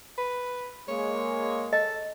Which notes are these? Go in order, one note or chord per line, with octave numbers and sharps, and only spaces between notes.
B4
G#3 A#3 C#5
A4 D#5